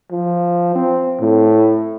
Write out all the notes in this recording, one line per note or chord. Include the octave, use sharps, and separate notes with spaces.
F3
C4
A2